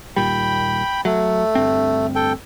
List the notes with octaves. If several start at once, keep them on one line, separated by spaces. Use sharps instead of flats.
D#2 A#2 G3 G5 B5
F#3 A3
D2 G2 C4
A4 G5